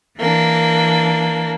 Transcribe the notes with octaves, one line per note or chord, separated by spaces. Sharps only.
E3 A#3 D4